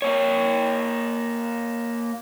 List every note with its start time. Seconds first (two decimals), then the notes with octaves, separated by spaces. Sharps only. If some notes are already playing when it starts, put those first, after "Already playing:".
0.02 A#3 C#5